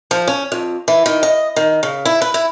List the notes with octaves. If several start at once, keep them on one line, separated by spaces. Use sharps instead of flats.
F3
C#4
F2
E3
D#3
D#5
D#3
C#3
E4
B4
E4